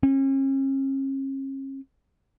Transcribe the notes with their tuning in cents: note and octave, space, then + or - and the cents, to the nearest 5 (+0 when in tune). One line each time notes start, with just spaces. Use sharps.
C#4 -40